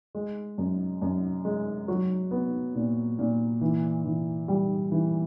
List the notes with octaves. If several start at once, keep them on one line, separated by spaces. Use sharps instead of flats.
G#3
F#2
F#2
G#3
F#3
B3
A#2
A#2
E3
E3
G3
E3